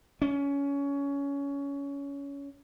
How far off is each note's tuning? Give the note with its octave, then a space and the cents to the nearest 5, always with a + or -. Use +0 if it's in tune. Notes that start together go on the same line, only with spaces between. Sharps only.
C#4 +20